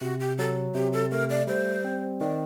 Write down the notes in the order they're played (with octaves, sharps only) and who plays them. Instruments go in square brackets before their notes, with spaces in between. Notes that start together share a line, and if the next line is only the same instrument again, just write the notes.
[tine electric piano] C3 [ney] F#4
[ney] G4
[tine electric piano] F#3 [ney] A4
[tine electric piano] C3 [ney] G4
[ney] A4
[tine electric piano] A3 [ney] A#4
[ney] D5
[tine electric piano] G3 [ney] C5
[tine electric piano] C4
[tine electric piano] D#3 [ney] D5